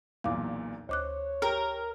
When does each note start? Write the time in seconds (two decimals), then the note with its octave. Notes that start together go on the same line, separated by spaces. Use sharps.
0.24 B1 E2 A#2 F5 D6
0.89 D2 C5 C#5 D6 F#6
1.42 G4 A#4 G5